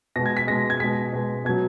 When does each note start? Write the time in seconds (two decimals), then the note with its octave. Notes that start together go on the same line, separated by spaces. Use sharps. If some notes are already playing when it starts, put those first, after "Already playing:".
0.16 B2 G#3 A#6
0.26 G#6
0.37 B6
0.47 B2 G#3 A#6
0.70 G#6
0.80 B2 G#3 B6
1.13 B2 G#3
1.45 B2 G#6
1.49 F#3